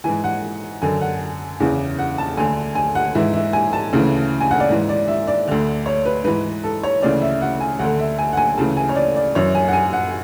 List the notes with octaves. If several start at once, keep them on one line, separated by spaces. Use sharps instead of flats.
G#2 E3 G#5
F#5
F#2 D3 G#5
F#5
E2 C#3 E3
F#5
A5
D2 D3 G#5
G#5
F#5
G#2 E3 E5
E5
G#5
A5
D2 C#3 E3
G#5
F#5
D5
G#2 E3
D5
E5
D5
D2 D3
C#5
B4
G#2 E3 B4
A4
C#5
D2 C#3 E3 D5
E5
F#5
G#5
D2 F#5
D3
E5
G#5
F#5
G#5
D2 C#3 E3 A5
G#5
C#5
D5
D5
F#2 E3 C#5
G#5
F#5
G#5
F#5